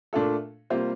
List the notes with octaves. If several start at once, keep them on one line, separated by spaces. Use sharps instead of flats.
A#2 A3 D4 F4 A4
C3 G3 A#3 F4 C5